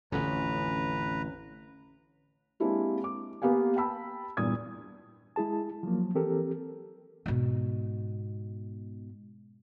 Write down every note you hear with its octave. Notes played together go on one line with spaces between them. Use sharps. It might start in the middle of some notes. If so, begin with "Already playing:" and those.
A1 F2 D3 C#4 B4 A#5
G#3 A#3 C4 D4 E4 G4
D6
A#3 B3 G4 F5 G#5
G5 A5 B5 E6
E2 G2 A#2 D#6 G#6
G#3 E4 G#4 A5
F3 F#3 A#3
E3 C4 G4 A4 A#4
G#2 B2